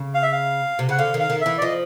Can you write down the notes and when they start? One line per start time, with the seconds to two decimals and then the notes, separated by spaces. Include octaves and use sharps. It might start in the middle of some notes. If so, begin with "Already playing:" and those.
Already playing: C#3
0.15 F5
0.23 E5
0.32 F5
0.79 C3
0.89 C#3 F#5
0.99 D3 F5
1.14 D#3
1.20 F5
1.30 D#3
1.41 E3 E5
1.58 D5
1.62 F3 D#5